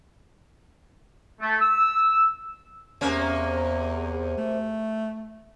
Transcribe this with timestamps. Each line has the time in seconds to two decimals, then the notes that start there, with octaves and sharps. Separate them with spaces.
1.41 A3
1.61 E6
3.01 E2 C3 A#3 C#4
4.38 A3